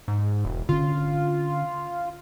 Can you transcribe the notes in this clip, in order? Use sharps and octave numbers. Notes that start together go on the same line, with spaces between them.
G#2
E1
D3 C#4 F4